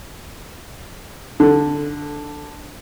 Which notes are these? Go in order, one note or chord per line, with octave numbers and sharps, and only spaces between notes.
D3